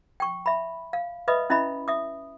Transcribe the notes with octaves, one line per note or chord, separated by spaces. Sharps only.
G5 C#6
E5 B5
F5
B4 D#5 E5 B5 D#6
C#4 E4 D#5 E5 B5
E5 D#6